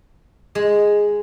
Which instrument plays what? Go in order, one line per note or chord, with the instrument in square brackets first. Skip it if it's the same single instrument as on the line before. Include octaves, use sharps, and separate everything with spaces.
[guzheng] G#3